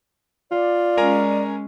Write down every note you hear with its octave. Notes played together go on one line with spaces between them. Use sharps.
F4 D5
G#3 C#4 A#4 G#5 A#5